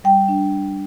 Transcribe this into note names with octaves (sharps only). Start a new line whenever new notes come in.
G3 G5
D4